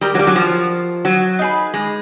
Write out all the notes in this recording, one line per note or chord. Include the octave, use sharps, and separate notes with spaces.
G3 G4 A#4 D#5
F#3
G3
F#3
F3
F#3
D#4 G#4 B4
G#3